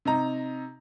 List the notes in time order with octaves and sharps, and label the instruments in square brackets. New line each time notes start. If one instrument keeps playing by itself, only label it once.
[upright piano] C3 D#4 A#5